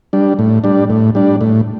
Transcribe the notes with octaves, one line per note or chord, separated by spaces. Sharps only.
G3 D4
A2
G3 D4
A2
G3 D4
A2